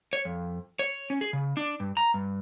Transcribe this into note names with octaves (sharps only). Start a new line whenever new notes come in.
C#5
F2
C#5
C#4
G#4
C#3
D4
G2
A#5
G2